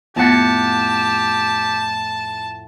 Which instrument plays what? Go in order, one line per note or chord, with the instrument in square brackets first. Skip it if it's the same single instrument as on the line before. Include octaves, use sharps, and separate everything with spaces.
[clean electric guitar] F2 A2 F#5 [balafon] B3 C4 F4 [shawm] G4 [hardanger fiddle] A5